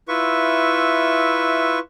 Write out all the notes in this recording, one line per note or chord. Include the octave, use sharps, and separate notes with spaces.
E4 F4 B4 E5 C#6